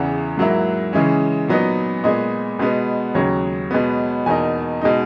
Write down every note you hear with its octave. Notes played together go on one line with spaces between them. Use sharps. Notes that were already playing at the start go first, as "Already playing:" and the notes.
Already playing: E2 C#3 E3 F#5
G#2 F#3 A#3 E4
C#3 E3 G#3 C#4
A#2 F#3 B3 D#4
A#2 G#3 B3 D#5
B2 G#3 B3
D#2 C#3 F#3 C#5
B2 G#3 B3
E2 B2 A#3 D#4 G#5
B2 G#3 D#4